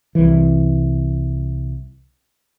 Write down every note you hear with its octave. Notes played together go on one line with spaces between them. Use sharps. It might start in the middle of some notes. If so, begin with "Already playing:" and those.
C2 E3